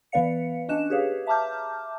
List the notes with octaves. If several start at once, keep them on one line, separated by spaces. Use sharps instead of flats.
E3 B3 B4 D5 F5 C#7
C#4 D4 D#5 F#6 E7
G4 G#4 B4 C#5 F5
E5 A5 A#5 D6 F6 G6